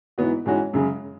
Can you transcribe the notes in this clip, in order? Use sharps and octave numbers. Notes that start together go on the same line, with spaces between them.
G#2 E3 B3 F#4
G#2 E3 G#3 C#4 F#4
F#2 C#3 G#3